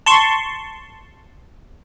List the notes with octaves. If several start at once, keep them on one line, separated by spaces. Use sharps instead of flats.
A5 C6 C#6